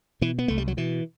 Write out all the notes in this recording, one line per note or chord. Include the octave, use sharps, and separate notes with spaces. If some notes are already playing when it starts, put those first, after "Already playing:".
B2 E3
B3
C2 A3
G3
F#3
B2 E3